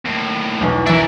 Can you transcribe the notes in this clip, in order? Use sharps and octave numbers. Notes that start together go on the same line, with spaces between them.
D#2 A2
B1 E2 B2
E3 D4 A#4 E5